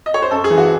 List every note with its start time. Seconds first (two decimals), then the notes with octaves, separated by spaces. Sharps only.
0.06 D#5
0.14 C#5
0.22 C5
0.31 F#2 A4
0.44 G#4
0.50 E3
0.57 F#4